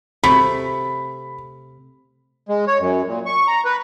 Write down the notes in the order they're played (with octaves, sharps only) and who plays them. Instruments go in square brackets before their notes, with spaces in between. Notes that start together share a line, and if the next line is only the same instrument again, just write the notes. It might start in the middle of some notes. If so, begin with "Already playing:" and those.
[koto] C3 A3 [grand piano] B5
[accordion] G#3
C#5
F#2
A#2
C#6
A#5
B4